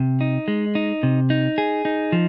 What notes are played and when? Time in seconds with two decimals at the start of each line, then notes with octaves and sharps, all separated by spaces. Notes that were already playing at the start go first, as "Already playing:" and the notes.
Already playing: C3
0.21 D#4
0.48 G#3
0.75 D#4
1.03 C3
1.30 D#4
1.58 G#4
1.85 D#4
2.12 F3